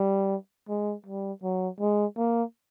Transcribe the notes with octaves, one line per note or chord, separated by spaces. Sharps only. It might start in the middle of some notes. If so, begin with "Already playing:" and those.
Already playing: G3
G#3
G3
F#3
G#3
A#3